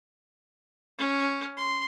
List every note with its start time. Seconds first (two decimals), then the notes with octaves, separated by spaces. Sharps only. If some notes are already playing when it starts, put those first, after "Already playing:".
0.98 C#4
1.57 C6